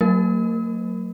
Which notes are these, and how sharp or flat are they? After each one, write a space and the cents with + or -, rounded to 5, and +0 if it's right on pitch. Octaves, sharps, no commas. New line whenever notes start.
F#3 +0 A#3 -45 A#4 +0